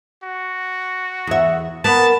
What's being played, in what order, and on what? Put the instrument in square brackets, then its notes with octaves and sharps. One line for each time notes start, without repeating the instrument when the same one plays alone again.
[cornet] F#4
[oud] E2 E5
[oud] A#3 B3 B4 [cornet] A5